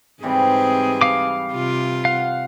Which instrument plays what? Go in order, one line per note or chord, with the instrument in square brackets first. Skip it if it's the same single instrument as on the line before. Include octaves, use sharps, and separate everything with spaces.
[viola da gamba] G#2 C4 G#4 [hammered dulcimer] C3 E3 G3
[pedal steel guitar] F5 D6
[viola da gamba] C3 F4
[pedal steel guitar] F5 [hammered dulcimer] F#5